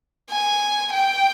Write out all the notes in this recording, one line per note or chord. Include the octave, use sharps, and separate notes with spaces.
G#5
G5